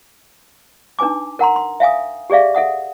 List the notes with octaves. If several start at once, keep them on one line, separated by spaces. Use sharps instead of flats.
D4 D#4 B4 G#5 D6
A#4 F#5 A#5 C6
C6
E5 F5 G#5 D#6
G4 G#4 D5 E5 F5
A4 E5 F#5 D#6